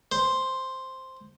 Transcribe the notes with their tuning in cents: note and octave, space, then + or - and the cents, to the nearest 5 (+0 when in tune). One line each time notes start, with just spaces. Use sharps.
C5 +0